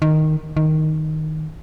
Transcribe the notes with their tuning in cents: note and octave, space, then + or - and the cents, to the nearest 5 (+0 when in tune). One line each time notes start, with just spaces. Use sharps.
D#3 -5
D#3 +0